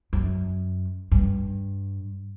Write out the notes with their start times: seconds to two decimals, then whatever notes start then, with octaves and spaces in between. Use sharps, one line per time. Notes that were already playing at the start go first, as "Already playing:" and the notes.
0.13 F#2
1.12 G2